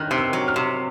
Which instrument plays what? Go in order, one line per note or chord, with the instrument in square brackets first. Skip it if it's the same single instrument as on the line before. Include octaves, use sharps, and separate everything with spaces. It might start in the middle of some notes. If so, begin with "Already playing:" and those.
Already playing: [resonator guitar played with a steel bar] D#3 [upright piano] F6 F#6
[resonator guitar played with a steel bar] C3
[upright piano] E6
[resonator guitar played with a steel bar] F#3
[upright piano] F6
[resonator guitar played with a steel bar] C3